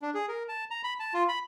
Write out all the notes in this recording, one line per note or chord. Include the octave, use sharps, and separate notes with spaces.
D4
G#4
A#4
A5
A#5
B5
A5
F4
B5